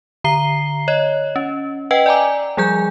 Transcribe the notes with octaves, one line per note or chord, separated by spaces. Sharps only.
D3 A#5 C7 G7
C#5 D#5
C#4
B4 D#5 F#5 G5
D5 G#5 A#5 D6
F3 G3 G#4 G#5 G6